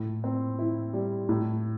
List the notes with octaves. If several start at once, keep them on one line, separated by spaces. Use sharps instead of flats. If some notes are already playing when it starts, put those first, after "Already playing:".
Already playing: A2
C4
E4
G3
A2